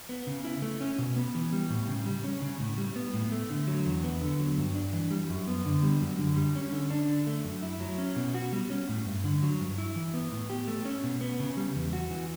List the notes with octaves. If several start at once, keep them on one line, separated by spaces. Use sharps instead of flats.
B3
C#3
E4
A3
C#4
B2
B3
E3
G3
A2
C#3
G3
C#4
C#3
A2
G3
B3
A2
A3
D3
F#3
E2
B3
D3
F#3
G2
D4
E3
G3
F#2
B3
D3
G3
F#2
D3
G3
C#4
D3
D4
D3
A3
F#2
E4
F#3
C#4
B2
F#4
G3
C#4
A2
G2
D3
F#3
G2
E4
E3
B3
A2
G4
A3
C#4
B2
B3
C#3
G3
E2
F#4
E3